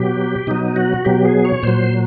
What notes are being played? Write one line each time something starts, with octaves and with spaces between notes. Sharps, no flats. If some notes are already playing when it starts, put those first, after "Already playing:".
Already playing: B2 F#3 G4
B2 F#3 D#4
F#4
B2 F#3 G4
G#4
C#5
A#2 F#3 C5